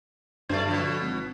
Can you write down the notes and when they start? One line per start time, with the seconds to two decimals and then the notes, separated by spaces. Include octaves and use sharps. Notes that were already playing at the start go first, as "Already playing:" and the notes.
0.49 G2 F#3 A3 C5 D5
0.68 B2 D3 F3
1.01 G#1